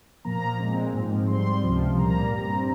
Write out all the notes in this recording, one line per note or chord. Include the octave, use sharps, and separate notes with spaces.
A#2 F3 A#3 A#5
A#2 G#3 C4
G#2 F3 C4
G#2 G3 C4 C6
C#2 C3 F3
A#2 G3 A#3 A#5
G2 G3 C4 A#5